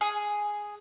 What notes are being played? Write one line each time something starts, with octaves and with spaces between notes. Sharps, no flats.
G#4